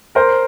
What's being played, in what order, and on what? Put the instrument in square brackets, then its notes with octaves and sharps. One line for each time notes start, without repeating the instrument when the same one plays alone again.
[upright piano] A#4 C5